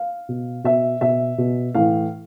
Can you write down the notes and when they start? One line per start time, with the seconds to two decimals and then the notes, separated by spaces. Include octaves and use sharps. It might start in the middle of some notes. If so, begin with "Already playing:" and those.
Already playing: F5
0.29 B2
0.64 B2 E5
1.01 B2 E5
1.38 B2
1.75 A2 E3 F5